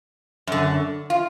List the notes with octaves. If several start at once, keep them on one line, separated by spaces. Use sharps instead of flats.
F#2 D3
F4